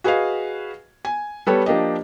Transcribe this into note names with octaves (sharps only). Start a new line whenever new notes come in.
F#4 G#4 B4 D#5 F5 G#5
G#5
G3 B3 A4 B4 C#5
F3 A#3 D4 G4 D#5